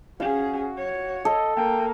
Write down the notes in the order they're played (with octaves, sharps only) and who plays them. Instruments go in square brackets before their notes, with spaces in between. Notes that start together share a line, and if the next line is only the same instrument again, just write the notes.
[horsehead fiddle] C#4 G#4 [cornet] F#4 [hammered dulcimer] F5
[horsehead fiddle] C#5
[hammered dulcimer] A4 [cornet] D#5
[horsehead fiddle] A#3 [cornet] G5